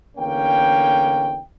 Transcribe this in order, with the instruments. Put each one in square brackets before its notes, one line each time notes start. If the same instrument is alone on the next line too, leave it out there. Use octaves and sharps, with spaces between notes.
[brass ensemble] E2 D3 A#3 C#4 G5